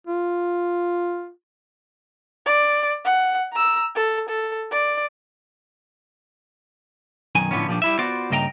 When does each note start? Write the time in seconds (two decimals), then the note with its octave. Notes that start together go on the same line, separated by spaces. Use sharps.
0.07 F4
2.46 D5
3.04 F#5
3.53 A#5 E6
3.96 A4
4.29 A4
4.71 D5
7.35 B1 F#2 D#3 G#5
7.51 A2 D3 F3 B3 C#4
7.67 A#2 F3 G3 D4
7.82 G3 E4 E5
7.99 B3 F4 F#4 C5 D5
8.30 G2 C#3 A#3 D#5 G5 A#5